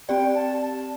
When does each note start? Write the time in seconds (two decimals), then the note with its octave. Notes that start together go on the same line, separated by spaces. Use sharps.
0.09 C4 G4 D5 G5
0.35 A5
0.62 A5